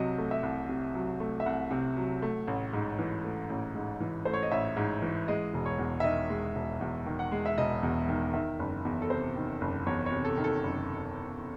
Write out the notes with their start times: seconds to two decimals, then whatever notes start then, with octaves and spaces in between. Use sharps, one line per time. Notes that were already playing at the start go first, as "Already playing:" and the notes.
Already playing: C2 C3 F#3 D#5
0.18 A3
0.31 E5
0.43 C2
0.69 C3
0.94 F#3
1.20 A3
1.40 E5
1.46 C2 F#5
1.71 C3
1.97 F#3
2.22 A3
2.48 A1
2.73 G#2
2.99 E3
3.24 A3
3.50 A1
3.75 G#2
4.00 E3
4.25 A3 C5
4.34 C#5
4.43 D#5
4.52 A1 E5
4.77 G#2
5.02 E3
5.28 G#3 D#5
5.54 E1
5.66 C#5
5.79 E2
6.00 E5
6.04 D#3 D#5
6.30 G#3
6.55 E1
6.81 E2
7.06 D#3
7.19 F#5
7.32 G#3
7.46 E5
7.58 E1 D#5
7.83 E2
8.09 D#3
8.34 D#3 E5
8.59 F#1
8.85 E2
9.02 A4
9.10 C3 C5
9.36 D#3
9.61 F#1
9.87 E2 C#5
10.06 C#5
10.12 C3
10.25 A4
10.37 D#3
10.44 A4
10.63 F#1